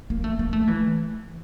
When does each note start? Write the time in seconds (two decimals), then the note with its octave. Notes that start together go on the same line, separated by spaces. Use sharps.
0.10 A#3
0.24 A3
0.39 A#3
0.53 A3
0.67 E3